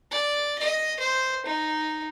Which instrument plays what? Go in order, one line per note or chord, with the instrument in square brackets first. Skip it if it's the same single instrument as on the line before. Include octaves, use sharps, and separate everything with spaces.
[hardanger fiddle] D5
D#5
C5
D#4